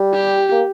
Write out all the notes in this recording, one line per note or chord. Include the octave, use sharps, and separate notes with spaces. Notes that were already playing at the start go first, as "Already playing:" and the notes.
Already playing: G3
G4
A#3